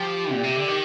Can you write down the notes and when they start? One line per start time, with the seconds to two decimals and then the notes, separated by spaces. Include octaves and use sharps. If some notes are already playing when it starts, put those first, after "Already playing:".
Already playing: F3 G4
0.32 A#2
0.43 C3
0.56 D3
0.68 D#3